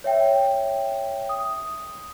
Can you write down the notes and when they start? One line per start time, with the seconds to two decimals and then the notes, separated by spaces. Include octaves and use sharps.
0.04 C#5 E5 G5
1.29 D#6